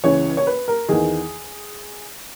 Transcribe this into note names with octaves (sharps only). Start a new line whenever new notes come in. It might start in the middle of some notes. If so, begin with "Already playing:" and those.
C#2 C#3 E3 C#5
C#5
B4
A#4
E2 D#3 G#4